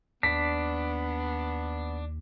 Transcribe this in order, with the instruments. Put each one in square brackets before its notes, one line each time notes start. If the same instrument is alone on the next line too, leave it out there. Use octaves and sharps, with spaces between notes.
[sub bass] D#2 [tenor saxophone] B3 [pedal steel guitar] D4 [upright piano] B6